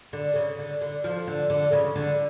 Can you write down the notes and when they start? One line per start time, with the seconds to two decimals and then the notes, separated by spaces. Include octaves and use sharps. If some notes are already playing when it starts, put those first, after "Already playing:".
0.13 D3
0.35 C#3
0.59 D3
0.81 D3
1.04 F3
1.27 D3
1.50 D3
1.72 C#3
1.96 D3